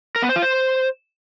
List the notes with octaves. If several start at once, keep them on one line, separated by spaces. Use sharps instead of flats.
A#4
B3
C5
F4
C5